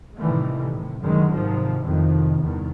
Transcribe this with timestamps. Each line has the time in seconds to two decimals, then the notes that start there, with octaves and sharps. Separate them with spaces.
0.17 A2 C3 D#3 E3 G3 A3
0.68 A2 C3
1.01 F#2 D3 D#3 F#3 G#3
1.32 G#1 C3 D#3 F3 F#3
1.82 F2 A2 C3 D#3
2.40 E2 G2 C3 D#3